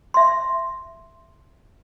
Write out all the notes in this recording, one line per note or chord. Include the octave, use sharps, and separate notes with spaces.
E5 C6